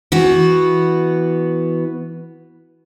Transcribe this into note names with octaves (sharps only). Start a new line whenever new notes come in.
E3 B3 F#4